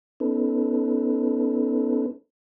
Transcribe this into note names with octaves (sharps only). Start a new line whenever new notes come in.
B3 C#4 D#4 A4 B4